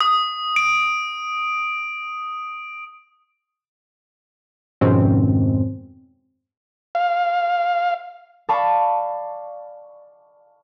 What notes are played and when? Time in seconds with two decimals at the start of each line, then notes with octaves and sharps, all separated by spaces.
0.01 D#6
0.56 D7
4.81 F2 G#2 B2 D#3 C4 C#4
6.95 F5
8.49 D5 F5 A5 B5 C#6 D6